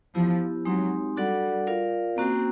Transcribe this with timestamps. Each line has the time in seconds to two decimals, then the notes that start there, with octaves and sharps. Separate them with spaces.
0.15 F3 B3 E4 G4
0.65 F#3 G#3 C4 D#4 G4
1.17 G3 D4 F#4 A4 D5 F#5
1.67 F4 A#4 D5 F5
2.18 A#3 C4 C#4 F#4